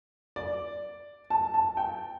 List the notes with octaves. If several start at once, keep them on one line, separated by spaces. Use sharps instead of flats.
D5
A5
A5
G5